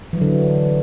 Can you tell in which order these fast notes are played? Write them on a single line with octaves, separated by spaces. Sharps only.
E3 F#3 D3